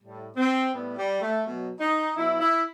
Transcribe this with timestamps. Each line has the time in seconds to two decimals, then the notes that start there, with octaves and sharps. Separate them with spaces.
0.01 A2 G3
0.36 C4
0.72 A2 G3 B3
0.97 G3
1.21 A3
1.45 B2 F#3
1.80 D#4
2.16 B2 F#3 E4
2.40 E4